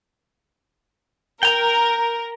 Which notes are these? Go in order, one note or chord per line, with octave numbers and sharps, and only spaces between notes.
A#4 G5 A#5